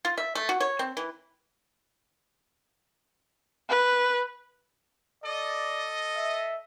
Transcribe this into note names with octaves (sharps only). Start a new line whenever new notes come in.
F4
E5
A3
F#4
C#5
C4
E3
B4
A4 D5 D#5
E5